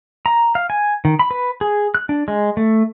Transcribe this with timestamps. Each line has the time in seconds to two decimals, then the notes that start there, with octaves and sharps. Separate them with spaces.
0.26 A#5
0.55 F5
0.70 G#5
1.05 D#3
1.19 B5
1.31 B4
1.61 G#4
1.95 F#6
2.09 D4
2.28 G#3
2.57 A3